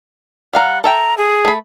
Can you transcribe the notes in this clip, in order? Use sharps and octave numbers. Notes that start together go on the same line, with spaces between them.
G3 F5 F#5 A#5
A4 E5 G5 A#5
G#4
A3 B5